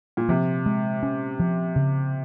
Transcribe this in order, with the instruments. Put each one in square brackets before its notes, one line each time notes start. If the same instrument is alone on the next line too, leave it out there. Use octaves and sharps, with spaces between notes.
[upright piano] A#2
[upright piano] C3 [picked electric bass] F3
[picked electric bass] G#3
C#4
F3
C#3